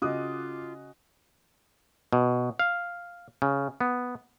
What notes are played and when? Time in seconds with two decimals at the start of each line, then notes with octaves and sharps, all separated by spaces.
0.02 C#3 F4 F#4 D#5 D6 D#6 F#6
2.13 B2
2.59 F5
3.42 C#3
3.81 B3